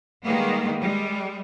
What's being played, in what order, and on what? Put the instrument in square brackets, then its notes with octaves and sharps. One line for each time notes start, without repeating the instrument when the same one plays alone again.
[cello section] D#3 G3 G#3 A#3 B3 G#4
G3 G#3